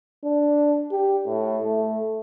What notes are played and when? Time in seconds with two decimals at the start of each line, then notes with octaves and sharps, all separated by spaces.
0.24 D4
0.91 G4
1.25 A2
1.63 A3